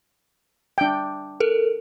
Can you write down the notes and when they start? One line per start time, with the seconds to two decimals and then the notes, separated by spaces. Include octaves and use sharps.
0.78 D4 G5
1.40 A4 A#4